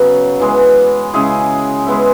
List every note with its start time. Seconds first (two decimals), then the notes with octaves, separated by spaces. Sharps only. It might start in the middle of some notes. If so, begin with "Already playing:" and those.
Already playing: C#3 F#3 B3 F#4
0.40 E3 G#3 B3
1.14 C#3 G#3 E4 G#4
1.86 G#3 B3 E4